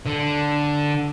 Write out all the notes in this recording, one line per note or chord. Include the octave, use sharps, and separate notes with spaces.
D3